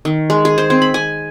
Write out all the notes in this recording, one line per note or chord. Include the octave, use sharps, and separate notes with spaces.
D#3
G#3
G#4
C5
C4
B5
G#5